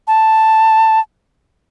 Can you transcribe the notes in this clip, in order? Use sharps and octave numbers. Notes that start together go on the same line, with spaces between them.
A5